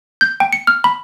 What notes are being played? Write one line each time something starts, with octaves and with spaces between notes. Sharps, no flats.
G6
G5
C#7
F6
B5